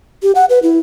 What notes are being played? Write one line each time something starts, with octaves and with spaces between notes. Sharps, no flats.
G4
F#5
B4
E4